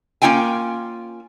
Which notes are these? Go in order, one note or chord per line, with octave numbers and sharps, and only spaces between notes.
A#3 C#4 F4 G5 G#5